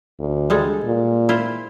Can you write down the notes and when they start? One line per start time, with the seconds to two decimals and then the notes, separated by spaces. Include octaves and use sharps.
0.20 D2
0.50 G3 G#3 A4
0.85 A#2
1.29 E4 F4 C5